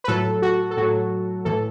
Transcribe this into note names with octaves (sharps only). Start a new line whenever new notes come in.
B4
A2 F#3 A4
F#4
A4
A2 F#3 F#4
A2 E3 A4